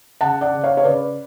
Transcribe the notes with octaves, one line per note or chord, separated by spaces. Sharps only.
C#3 F#5 A5
D5 F#5
C#3
C#5 F5
C#5
C#3 B4 D5